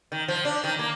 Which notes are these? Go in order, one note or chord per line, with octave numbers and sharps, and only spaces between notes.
D#3
F3
D4
D#3
A#3